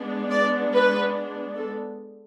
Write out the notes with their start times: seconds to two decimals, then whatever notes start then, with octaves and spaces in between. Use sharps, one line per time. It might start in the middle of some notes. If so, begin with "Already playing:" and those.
Already playing: G#3 B3 D4
0.30 D5
0.72 B4
1.55 A4